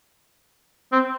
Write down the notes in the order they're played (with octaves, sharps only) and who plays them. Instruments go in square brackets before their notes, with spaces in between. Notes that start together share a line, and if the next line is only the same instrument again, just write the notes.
[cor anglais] C4